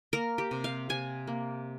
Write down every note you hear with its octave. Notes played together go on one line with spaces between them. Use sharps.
A#3 A#4
G4
C3
F5
C3 G#5
A#3